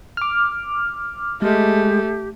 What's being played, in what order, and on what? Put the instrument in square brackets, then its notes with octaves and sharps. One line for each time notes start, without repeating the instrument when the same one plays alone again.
[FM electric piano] D6 F6
[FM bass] G#3 [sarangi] A3 [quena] G4